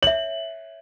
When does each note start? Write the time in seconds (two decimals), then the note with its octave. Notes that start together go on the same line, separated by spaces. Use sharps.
0.03 C#5 E5 F#7